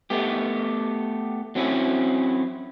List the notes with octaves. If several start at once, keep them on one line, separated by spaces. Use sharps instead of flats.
A3 B3 G4
F#3 C4 C#4 E4